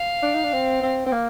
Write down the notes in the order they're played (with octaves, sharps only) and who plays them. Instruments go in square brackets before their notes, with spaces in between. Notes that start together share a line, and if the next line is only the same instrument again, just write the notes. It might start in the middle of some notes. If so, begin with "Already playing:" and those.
Already playing: [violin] F5
[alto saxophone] D4
D#4
D4
C4
C4
C4
A#3